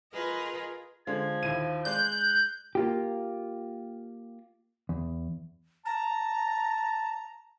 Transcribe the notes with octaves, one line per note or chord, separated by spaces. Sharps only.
F4 G#4 A#4 B4 D#5
D3 F3 G#3 G#6
D#2 E4 D#7
G#3 D5 F#6 G6
A#3 F4 G4
E2
A5 A#5